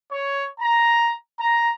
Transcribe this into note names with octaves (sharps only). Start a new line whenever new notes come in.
C#5
A#5
A#5